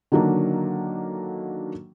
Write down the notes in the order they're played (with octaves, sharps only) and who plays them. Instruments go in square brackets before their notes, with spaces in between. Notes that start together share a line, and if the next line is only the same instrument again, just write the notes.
[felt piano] D3 D#3 F#3 A#3 D4